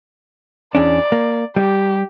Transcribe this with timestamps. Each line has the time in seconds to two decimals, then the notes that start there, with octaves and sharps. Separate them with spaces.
0.75 E2 C#4 D4 D5
1.12 A#3
1.56 G3 G4